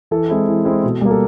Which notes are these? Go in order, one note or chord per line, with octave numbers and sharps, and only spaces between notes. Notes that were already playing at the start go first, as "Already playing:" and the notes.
E3 A4
G#3 C4 E4
E3
G#3 C4 E4
B2
G3 A#3
A4